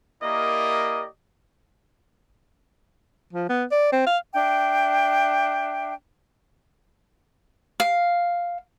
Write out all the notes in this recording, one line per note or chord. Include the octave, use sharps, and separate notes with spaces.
A#3 E4 G4 A#4 D5 D#5
F3
B3
D5
C4
F5
D4 E5 G5
F5